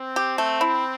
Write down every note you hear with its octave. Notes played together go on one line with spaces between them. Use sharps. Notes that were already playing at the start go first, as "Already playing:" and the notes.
Already playing: C4
G4
A3
E4